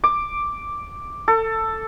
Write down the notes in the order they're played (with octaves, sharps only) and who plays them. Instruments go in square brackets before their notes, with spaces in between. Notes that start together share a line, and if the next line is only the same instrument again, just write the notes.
[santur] D6
A4